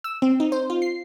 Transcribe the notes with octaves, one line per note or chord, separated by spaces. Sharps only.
E6
C4
D#4
C5
F4
C7